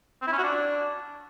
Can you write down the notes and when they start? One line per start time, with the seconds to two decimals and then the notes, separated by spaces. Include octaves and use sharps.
0.22 C4
0.27 E4
0.33 C#4
0.38 F#4
0.44 D4